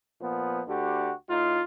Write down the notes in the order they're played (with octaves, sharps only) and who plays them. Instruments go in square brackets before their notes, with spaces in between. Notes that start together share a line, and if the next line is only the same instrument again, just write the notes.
[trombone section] A#2 F3 B3
D2 D3 F#4 G4
A2 D#4 F4